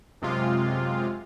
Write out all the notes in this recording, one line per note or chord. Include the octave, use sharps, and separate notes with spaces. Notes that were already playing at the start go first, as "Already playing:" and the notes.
F#2 C3 G#3 F4